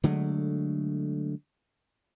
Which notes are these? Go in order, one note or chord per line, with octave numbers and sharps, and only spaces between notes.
D3 F#3 G#3 A3